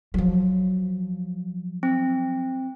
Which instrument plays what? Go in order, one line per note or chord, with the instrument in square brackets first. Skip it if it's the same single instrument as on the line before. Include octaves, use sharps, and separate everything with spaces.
[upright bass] F3 F#3
[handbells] C4